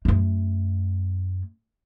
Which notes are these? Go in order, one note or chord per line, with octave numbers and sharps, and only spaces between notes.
F#2 A3